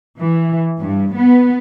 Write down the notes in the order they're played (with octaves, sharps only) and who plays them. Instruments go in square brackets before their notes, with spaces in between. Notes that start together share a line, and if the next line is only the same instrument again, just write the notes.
[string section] E3
G2
B3